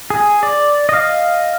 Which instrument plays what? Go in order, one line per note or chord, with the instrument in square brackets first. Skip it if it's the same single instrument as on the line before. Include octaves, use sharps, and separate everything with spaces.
[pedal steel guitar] G#4
D5
D#5 F5